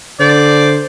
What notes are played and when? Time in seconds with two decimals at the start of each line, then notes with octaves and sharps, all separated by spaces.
0.20 D3 C5 D5